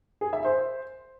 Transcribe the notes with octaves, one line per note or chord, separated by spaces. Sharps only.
G#4
E5
C5